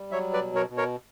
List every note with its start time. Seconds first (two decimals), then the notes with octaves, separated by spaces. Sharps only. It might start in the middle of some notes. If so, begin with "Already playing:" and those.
Already playing: G3
0.11 F#3 C#5 E5
0.33 B4 D5
0.42 B2
0.55 A#4 C#5
0.70 B2
0.77 A#4 C#5